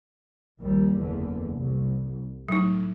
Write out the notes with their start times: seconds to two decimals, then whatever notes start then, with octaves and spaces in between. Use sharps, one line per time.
0.61 A#1 D#2 G3
0.96 F#1 E2 D3
1.52 C2
2.48 A2 F#3 D#4